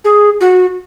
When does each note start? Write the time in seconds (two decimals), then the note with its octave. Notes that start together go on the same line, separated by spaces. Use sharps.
0.04 G#4
0.41 F#4